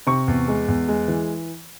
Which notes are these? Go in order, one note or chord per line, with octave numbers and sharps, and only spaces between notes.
C3 C#6
E2
G#3
E2
G#3
E3